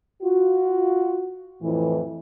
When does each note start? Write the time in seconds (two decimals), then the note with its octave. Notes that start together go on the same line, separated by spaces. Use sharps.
0.23 F4 F#4
1.62 F2 A2 E3